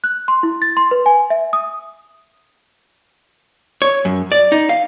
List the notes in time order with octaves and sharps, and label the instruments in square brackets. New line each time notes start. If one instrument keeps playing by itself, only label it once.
[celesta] F#6
C6
E4
A6
C6
B4
G#5
E5
D#6
[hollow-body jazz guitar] C#5
F#2
D5
D#4
F5